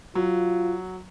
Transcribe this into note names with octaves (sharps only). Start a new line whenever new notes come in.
F#3 F4